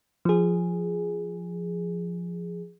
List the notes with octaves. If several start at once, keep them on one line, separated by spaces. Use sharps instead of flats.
F3 G#4